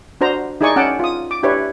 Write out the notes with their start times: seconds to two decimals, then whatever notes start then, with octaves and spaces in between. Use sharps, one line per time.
0.21 D4 F#4 C5 A#5
0.61 D#4 E4 G#4 D5 G#5 C#6
0.76 C#4 F#5 G5 A5 D6
1.00 F4 D#6
1.31 D6
1.43 D4 E4 G4 B4 C#5